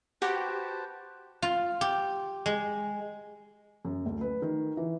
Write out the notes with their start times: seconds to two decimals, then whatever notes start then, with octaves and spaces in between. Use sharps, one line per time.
0.22 F#4 G4 B4 C5 A5
1.42 F4
1.81 G4
2.46 G#3
3.85 F#2
4.06 D2
4.21 B4
4.42 D#3
4.77 E3